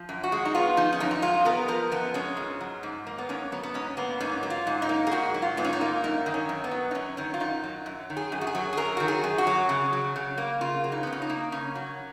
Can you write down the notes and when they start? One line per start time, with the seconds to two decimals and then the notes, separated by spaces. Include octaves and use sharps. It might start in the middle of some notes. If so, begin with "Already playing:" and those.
Already playing: F3
0.09 F#2
0.24 F#4
0.32 G#3
0.45 D#4
0.55 B3 F4
0.77 F3 D#4
0.92 C#4
1.00 F#2 D#4
1.11 D#4
1.22 G#3 F4
1.45 B3 A#4
1.68 F3 A#4
1.92 F#2 B3
2.14 G#3 C#4
2.37 G#2
2.61 F#3
2.83 G#2
3.07 A#3
3.18 B3
3.29 G#2 C#4
3.52 F#3 B3
3.63 B3
3.74 G#2 C#4
3.97 A#3 B3
4.21 G#2 C#4
4.43 F#3
4.50 F4
4.67 G#2
4.82 D#4
4.89 A#3
5.07 G#4
5.12 G#2 F#4
5.34 F#3
5.42 F4
5.57 G#2 B3
5.65 C#4
5.73 D#4
5.81 A#3
6.04 F#2 D#4
6.26 D#3
6.34 C#4
6.49 F#2
6.64 B3
6.71 F#3
6.91 D#4
6.95 F#2 C#4
7.17 D#3 C#4
7.34 F4
7.40 F#2 D#4
7.63 F#3
7.86 F#2
8.10 D#3
8.17 G#4
8.32 F#2
8.41 F#4
8.47 G#4
8.55 F#3
8.73 G#4
8.77 F#2 A#4
8.97 D#3 F#4
9.08 G#4
9.24 F#2
9.38 F#4
9.47 F#3
9.69 C#3
9.93 F#3
10.16 C#3
10.38 A#3
10.61 C#3 F4
10.84 F#3
10.92 D#4
11.03 C#3 B3
11.13 C#4
11.22 D#4
11.30 A#3
11.52 C#3 C#4
11.75 F#3